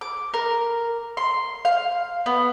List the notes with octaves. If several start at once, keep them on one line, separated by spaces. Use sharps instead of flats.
D6
A#4
C6
F5
B3